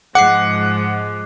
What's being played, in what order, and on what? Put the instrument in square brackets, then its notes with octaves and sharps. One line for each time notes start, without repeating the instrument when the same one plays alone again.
[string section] G#2 F3 G#3 [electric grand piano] F#5 [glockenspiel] D6 F#6 C7